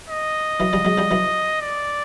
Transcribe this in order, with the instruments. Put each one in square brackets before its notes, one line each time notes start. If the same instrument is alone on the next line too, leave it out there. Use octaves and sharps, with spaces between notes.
[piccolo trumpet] D#5
[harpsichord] E3 F#3
F3 G3
F#3 G#3
F3 G3
E3 F#3
[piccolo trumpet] D5